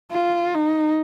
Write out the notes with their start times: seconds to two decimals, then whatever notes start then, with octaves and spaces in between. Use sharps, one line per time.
0.11 F4
0.54 D#4